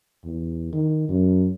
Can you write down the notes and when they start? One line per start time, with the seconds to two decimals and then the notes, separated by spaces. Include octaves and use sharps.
0.24 E2
0.73 D#3
1.09 F#2